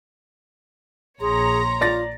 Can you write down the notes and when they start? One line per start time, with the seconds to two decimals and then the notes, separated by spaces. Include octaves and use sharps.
1.21 A#1 G#4 C#5 A#5 C6
1.81 F4 D5 A6 A#6